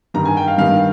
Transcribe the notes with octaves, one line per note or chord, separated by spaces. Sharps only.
G2 D#3 G3 A#5
G#5
G5
F5
G2 D#3 G3 F5